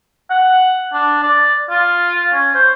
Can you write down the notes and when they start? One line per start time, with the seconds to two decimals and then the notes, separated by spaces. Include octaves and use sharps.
0.30 F#5
0.94 D4
1.23 D5
1.70 F4
2.33 C#4
2.55 C5